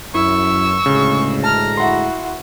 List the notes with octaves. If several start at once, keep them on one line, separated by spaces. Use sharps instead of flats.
F#2 E4 C#6 E6
D2 A2 C#3 G#3
A5 A#5 F6
E4 F#4 F#5 C6